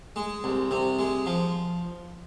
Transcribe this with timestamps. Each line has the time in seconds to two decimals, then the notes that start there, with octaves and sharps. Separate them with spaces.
0.16 G#3
0.44 C2
0.71 C3
0.99 G#3
1.26 F3